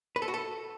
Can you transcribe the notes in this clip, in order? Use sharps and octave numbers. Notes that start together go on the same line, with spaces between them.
B4
A4
F#4
A4